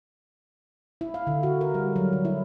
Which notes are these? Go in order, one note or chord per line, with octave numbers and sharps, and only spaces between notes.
E4
F5
D3
F#4
A#4
G3
F#3
D3
E4